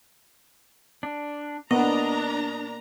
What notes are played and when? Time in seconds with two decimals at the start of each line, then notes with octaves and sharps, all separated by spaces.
1.03 D4
1.71 A#2 B3 D4 D#5 A#5